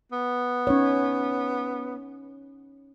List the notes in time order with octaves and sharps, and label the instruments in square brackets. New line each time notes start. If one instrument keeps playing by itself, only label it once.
[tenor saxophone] B3
[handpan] C#4 D#4 C#5